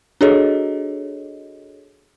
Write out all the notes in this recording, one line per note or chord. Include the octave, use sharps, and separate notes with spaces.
D4 F#4 G#4 A4 C#5 D#5